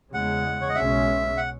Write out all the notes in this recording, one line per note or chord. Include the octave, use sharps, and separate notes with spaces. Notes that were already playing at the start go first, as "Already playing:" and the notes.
E2 C#3 G#3 F#5
C#5
D#5
B1 B2 G#3 C#4 E5
F#5